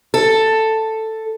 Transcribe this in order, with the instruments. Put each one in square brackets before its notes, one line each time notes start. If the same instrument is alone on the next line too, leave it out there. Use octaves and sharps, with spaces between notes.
[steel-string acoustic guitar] A4